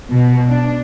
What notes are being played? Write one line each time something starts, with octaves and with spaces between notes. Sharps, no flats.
B2
D4